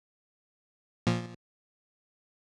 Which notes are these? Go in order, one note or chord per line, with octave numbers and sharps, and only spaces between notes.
A#2 F3